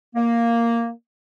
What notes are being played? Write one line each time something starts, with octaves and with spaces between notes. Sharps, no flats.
A#3